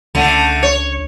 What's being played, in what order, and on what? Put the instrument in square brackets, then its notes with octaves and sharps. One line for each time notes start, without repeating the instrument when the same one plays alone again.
[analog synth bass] C#2 [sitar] D3 A3
[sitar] C#5